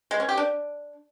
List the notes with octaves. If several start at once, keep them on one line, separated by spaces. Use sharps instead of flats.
G#3
C#4
G4
D4